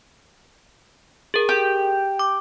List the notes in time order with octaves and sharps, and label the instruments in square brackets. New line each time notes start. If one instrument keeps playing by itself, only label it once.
[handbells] G#4 A#4
[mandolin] G4
[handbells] D6